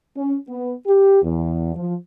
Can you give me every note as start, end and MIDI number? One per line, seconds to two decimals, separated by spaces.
0.16 0.35 61
0.48 0.72 59
0.86 1.21 67
1.22 1.71 40
1.75 1.94 53